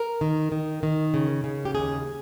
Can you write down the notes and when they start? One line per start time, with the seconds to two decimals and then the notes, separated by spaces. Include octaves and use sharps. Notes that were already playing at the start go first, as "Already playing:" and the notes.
Already playing: A#4
0.21 D#3
0.52 D#3
0.83 D#3
1.14 C#3
1.44 C#3
1.65 G4
1.75 D#2 G#4